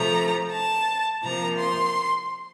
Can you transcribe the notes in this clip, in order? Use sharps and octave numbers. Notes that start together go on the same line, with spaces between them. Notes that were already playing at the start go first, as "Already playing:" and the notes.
Already playing: C3 F3 A3 A#5
A5
C3 F3 A#3 A#5
C6